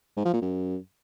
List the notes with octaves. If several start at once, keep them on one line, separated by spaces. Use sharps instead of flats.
G#2
F3
A#2
F#2